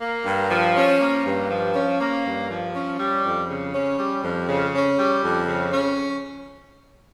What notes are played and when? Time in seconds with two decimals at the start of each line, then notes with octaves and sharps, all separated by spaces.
0.02 A#3
0.26 G2
0.51 F3
0.77 C#4
1.01 A#3
1.26 G2
1.50 F3
1.76 C#4
2.01 A#3
2.25 G2
2.50 F3
2.75 C#4
3.00 G3
3.25 F2
3.50 C#3
3.75 C#4
3.99 G3
4.24 F2
4.49 C#3
4.75 C#4
4.99 G3
5.24 F2
5.48 C#3
5.73 C#4